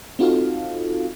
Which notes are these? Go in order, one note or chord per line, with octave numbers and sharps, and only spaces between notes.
C4 D#4 F4 F#4 A4 F5